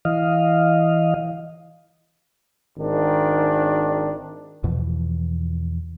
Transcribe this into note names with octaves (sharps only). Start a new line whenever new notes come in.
E3 D#5 F5
G#1 D#3 D4
E2 B2 E3 F3